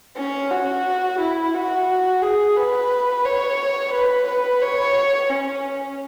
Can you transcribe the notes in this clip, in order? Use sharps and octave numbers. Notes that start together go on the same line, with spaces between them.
C#4
F#4
E4
F#4
G#4
B4
C#5
B4
B4
C#5
C#4